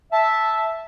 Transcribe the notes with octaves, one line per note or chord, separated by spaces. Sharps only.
E5 A5